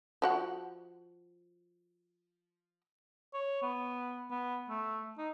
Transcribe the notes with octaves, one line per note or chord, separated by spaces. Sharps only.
F3 F#4 F#5
C#5
B3
B3
A3
D#4